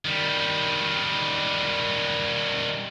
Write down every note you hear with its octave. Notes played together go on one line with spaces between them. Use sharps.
D#3 G3